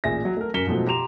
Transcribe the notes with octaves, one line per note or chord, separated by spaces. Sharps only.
A1 A#2 G#4 E5 A#6
F#3
A3 A#4
F#2 A#4 B6 C#7 E7 G7
G#2 B2 F3 F#3 A3
G4 A#5 C6 E7 F7